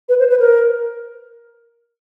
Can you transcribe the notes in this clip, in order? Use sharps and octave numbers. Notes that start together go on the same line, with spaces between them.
B4
C5
B4
A#4